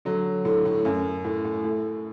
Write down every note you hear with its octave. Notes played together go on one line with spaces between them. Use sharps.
D3 F#3
A2 D3
A2
F#2
A2
A2
A2